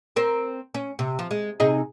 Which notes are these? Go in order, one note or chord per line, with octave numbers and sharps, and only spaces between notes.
C4 A#4 C5
C#4
C3
F3
G#3
C3 D#4 G#4